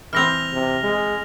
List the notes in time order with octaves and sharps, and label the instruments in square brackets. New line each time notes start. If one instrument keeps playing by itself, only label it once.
[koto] E3 C4 [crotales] F6 A#6 F7
[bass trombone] C3
G#3